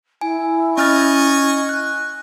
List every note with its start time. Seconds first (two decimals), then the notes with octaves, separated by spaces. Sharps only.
0.21 E4 G#5
0.78 C#4 D#5 G#5 C#6 F6 A6
1.69 F#6